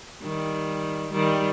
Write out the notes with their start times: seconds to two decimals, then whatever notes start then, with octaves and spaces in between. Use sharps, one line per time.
0.22 D#3 G3
1.12 D#3 G3